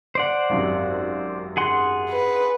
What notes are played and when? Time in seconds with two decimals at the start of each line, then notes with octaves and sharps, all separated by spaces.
0.15 C5 D5 F#5
0.50 G#1 F#2 C3
1.57 G#4 F#5 C6
2.10 B4